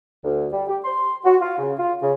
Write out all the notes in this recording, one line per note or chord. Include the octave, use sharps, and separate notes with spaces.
D2
G3
G4
C6
F#4
F4
C#3
F4
C#3